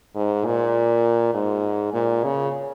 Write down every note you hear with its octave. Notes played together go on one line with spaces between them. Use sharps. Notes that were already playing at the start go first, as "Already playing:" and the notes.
G#2
A#2
G#2
A#2
C#3